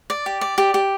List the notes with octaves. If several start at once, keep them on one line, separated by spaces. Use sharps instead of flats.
D5
G4
D5
G4
G4